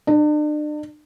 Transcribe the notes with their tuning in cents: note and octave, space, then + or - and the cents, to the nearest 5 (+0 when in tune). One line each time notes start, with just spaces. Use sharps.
D4 +40